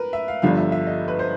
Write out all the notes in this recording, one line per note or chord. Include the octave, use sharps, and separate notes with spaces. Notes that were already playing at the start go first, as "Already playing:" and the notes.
Already playing: A#4 B4
E5
F5
G1 G2 D3 F3 F5
E5
E5
D#5
B4
C5